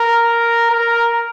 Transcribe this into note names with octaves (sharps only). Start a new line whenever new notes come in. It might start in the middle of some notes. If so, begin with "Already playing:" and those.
Already playing: A#4
A#4